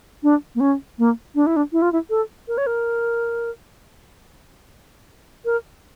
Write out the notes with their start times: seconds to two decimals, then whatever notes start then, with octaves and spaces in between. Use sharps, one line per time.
0.23 D4
0.55 A#3
0.60 C#4
0.98 A#3
1.35 D4
1.47 E4
1.56 D4
1.72 E4
1.82 F4
1.92 E4
2.10 A4
2.48 A#4
2.58 C#5
2.67 A#4
5.45 A#4